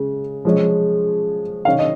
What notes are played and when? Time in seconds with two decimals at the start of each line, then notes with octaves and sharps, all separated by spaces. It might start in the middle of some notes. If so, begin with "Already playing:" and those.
Already playing: C#3 G#3
0.45 F3 G#3 C#4
1.65 D#3 C#4 F5
1.79 D#5